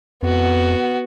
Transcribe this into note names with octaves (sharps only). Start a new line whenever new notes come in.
F2 B3 F#4